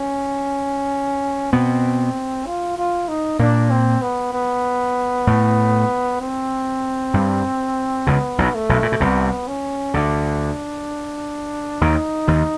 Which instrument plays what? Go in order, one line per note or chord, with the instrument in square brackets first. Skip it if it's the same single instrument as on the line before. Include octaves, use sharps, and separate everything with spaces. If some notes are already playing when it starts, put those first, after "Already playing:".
Already playing: [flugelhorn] C#4
[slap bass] B2 B3 [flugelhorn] C4
[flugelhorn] F4
F4
D#4
[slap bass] A#2 A#3 [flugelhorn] D4
[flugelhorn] C4
B3
B3
[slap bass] A2 A3
[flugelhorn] C4
[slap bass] G2 G3
[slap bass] C#2 C#3 [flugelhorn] B3
[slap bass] B1 B2
[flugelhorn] A3
[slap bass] B1 B2
A#2
B2
[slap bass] C2 C3 [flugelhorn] B3
[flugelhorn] C#4
[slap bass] D2 D3 [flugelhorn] D4
[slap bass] D#2 D#3 [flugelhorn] D#4
[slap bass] D#2 D#3